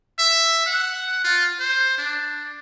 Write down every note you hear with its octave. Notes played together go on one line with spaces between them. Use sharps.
E5
F#5
F4
C5
D4